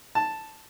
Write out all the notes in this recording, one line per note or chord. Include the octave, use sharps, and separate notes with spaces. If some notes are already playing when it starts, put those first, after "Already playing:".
A5